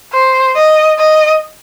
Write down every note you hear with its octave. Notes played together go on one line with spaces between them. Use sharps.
C5
D#5
D#5